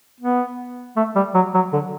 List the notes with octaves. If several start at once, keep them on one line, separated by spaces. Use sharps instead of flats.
B3
A3
G3
F#3
F#3
D3